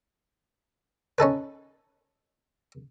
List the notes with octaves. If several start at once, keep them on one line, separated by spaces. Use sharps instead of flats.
C#4 D#4 A4 B4